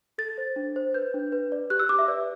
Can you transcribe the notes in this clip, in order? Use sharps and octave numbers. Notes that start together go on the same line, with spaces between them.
A4 A6
C5
D4
C5
B4 G6
D4
B4
D5
G4 F#6
E6
G4 D6
E5
B4 D5